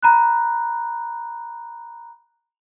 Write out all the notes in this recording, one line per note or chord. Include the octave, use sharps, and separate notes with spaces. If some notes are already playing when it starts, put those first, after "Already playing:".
A#5 B5 F#6